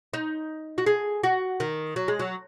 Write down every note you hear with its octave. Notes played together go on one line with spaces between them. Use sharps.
D#4
F#4
G#4
F#4
D#3
F#3
G#3
F#3